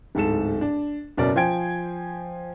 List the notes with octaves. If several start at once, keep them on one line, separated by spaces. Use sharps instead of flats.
D1 G#2 A4 E7
D4
F#1 B2 C#4 A#4 D5
F3 C5 G5 G#5 G#6 D7